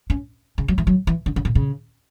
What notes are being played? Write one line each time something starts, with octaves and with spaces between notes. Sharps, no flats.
C#4
C#3
F#3
E3
F#3
E3
D3
C#3
B2
C#3